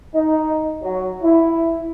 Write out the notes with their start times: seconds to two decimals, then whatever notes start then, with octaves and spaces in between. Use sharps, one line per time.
0.15 D#4
0.83 F#3
1.23 E4